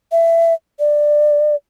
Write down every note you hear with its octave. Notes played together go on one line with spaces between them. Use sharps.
E5
D5